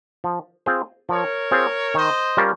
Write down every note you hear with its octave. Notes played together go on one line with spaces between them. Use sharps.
F3
C4 F4 G#4 C5
F3 A#4 C#5
C4 F4 G#4 C5
D#3 C5 D#5
G3 C#4 F4 A#4